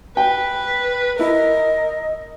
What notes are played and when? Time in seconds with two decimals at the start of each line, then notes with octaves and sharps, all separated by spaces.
0.17 B4 G5
1.19 E4 A#4 D#5